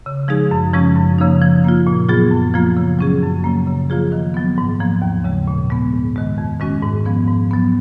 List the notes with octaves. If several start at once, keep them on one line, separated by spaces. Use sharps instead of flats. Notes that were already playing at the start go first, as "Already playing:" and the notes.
C#3
F3 G#3 D#4 G#4
F#2
C#3 F3 G#3 C#4
F#2
C#3 F3 A#3 D#4
F3
A#3 F4
A#2
F#3 B3 F4 G#4
F#2
F3 A#3 F4
C#3
F#3 C#4 G#4
F#2
C#3 F#3 A#3
C#3
F3 A#3 F4 G#4
D#3
F#3 B3
G#2
F3 A#3
D#2
C#3 G#3
A#2
G#3 B3
G#2
D#3 G#3
F2
D#3 G#3 C#4 F#4
G#2
F3 B3
G#2
F#3 B3